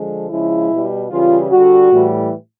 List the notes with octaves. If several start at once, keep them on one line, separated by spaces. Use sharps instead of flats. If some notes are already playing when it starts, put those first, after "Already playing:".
Already playing: D3 F3 G#3
C#3 F3 G#3 E4
B2 G3
C#3 E3 G3 F4
D3 G3 F#4
A2 E3 G3